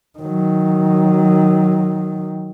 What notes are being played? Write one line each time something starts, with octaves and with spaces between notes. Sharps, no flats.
D#3 F#3